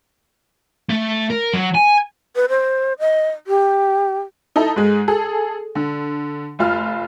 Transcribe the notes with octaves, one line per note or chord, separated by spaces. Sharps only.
A3
A#4
F#3
G#5
B4
C5
D#5
G4
D#4 E4 A4
G#2 G#3
G#4 A4
D3
F1 F4 F6